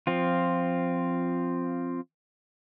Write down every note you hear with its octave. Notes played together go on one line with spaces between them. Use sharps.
F3 C4 F4